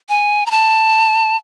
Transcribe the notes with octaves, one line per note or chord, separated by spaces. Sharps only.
G#5
A#5
A5